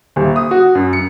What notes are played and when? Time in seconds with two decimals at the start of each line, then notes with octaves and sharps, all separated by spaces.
0.16 D#1
0.36 D#6
0.51 F#4
0.75 F#2
0.93 C#7